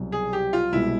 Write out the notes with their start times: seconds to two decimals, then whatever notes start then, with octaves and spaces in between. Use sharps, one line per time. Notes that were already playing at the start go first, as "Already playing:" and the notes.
Already playing: C2 B2 F#3
0.12 G#4
0.33 G4
0.53 F4
0.72 C2 B2 G#3 E4